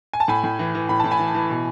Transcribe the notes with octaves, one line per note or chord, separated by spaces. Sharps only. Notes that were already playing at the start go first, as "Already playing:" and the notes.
G#5
A5
A2 G#5 B5
A2
E3
E3
A2 B5
A2 A5
G#5 B5
E3
E3
B2